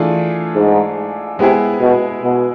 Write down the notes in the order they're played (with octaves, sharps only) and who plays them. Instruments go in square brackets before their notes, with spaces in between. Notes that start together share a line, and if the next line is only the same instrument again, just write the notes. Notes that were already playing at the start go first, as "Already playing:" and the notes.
Already playing: [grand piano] E3 A3 D4 F4 G#4
[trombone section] G#2
[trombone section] C3 [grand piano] G#3 B3 E4 G#4
[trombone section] B2
B2